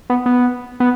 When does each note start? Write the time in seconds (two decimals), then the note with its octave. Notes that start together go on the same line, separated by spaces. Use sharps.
0.10 B3
0.26 B3
0.80 B3